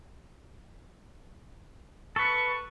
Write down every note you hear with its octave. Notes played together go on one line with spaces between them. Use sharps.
A4 B4 C#6